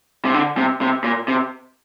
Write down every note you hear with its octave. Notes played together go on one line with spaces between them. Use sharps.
C3
D3
C3
C3
A#2
C3